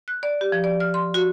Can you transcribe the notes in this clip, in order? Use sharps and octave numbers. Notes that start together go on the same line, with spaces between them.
F#6
D5
G4
F3
D5
F6
C6
F#4